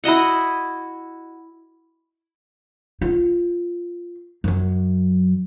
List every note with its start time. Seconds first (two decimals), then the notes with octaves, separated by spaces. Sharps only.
0.04 E4 F#4 D#5 F#5
3.01 F4
4.44 F#2 F#3